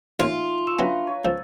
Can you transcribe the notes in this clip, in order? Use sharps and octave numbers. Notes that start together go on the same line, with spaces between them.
A1 A#3 D#4 F4 C#5 E5 F5
F3 C#6 E6 E7
F#3 B3 C#4 D4 B4 E5 A#5
C#5
C#2 F3 E6 A6